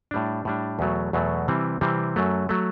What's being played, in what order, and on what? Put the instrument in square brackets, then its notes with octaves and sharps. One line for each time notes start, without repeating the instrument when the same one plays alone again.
[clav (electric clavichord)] A2 G3 D4
A2 G3 D4
E2 B2 F#3 A3
E2 B2 F#3 A3
C3 E3 G3 C4
C3 E3 G3 C4
F#2 F#3 A3
F#3 A3